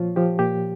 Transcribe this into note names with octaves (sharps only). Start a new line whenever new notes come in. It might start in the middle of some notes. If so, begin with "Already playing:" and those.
Already playing: A#2 F3 F4 C#5
F3 G4
A#2 G4